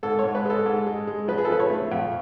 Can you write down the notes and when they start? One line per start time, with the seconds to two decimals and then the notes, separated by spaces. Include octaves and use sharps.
0.03 G#2 A4
0.19 G#2 C#5
0.35 B4
0.45 G#3 A4
0.66 G#2
0.86 G#3
1.07 G#3
1.28 F3 B4
1.38 G#4
1.45 A4
1.49 F3 B4
1.60 C#5
1.70 A3
1.92 F2